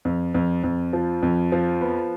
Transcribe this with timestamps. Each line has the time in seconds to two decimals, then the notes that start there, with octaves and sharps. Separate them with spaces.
0.05 F2
0.34 F2
0.64 F2
0.93 F3
1.23 F2
1.52 F3
1.81 B3